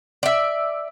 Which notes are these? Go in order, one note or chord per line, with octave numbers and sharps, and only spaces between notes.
D5 E5